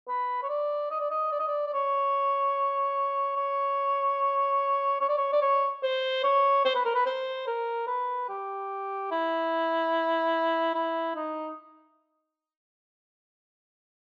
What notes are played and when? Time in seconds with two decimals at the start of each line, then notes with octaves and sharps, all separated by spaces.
0.08 B4
0.43 C#5
0.49 D5
0.91 D#5
1.00 D5
1.10 D#5
1.32 D5
1.39 D#5
1.47 D5
1.67 D5
1.73 C#5
3.36 C#5
5.01 C#5
5.09 D5
5.17 C#5
5.32 D5
5.41 C#5
5.83 C5
6.24 C#5
6.65 C5
6.75 B4
6.85 A#4
6.95 B4
7.06 C5
7.47 A#4
7.87 B4
8.29 G4
9.11 E4
10.74 E4
11.16 D#4